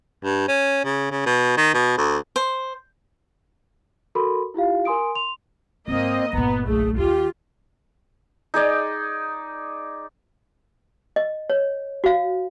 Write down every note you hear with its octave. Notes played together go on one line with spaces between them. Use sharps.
G2
C#4
C#3
C#3
B2
D#3
B2
D2
C5
F#4 A4 A#4 B5 C6
E4 F4 G4 F5
A#4 G#5 C6 D#6 D7
C6 F7
G#1 A#3 C4 F4 D#5
G1 A#2 B3 A#5
B1 A3 G#4
D#2 F4 G4
D#4 G#4 D5 D#5
D#5
C#5
F#4 F5